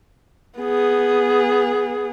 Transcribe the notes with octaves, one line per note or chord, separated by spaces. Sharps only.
B3 G#4